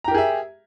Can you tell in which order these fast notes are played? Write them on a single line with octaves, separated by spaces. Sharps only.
A#5 G4 A#4 G#4 E5